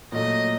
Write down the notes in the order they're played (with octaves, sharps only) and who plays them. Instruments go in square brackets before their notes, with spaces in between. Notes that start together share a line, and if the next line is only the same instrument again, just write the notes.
[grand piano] A#2 F#3 A3 [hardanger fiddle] D#5